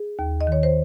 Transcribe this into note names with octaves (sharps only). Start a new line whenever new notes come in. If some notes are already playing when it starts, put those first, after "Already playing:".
Already playing: G#4
D#2
D#5
D#3 C#5
C5